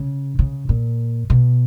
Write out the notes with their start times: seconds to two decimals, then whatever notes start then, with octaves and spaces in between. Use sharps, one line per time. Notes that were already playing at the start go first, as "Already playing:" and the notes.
Already playing: C#3
0.39 C#3
0.69 A#2
1.30 B2